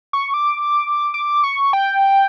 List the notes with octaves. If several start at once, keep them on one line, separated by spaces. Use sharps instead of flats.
C#6
D6
D6
C#6
G5